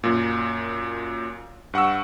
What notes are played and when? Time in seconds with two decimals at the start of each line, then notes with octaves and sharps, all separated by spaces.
0.03 F#2 A#2
1.74 G2 F#5 C#6 E6